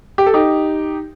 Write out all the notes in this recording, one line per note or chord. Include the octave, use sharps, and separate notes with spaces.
G4
A4
D#4 G4